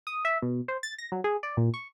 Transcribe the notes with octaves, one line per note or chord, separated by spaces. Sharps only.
D#6
E5
B2
C5
A6
A#6
F#3
G#4
D5
A#2
C#6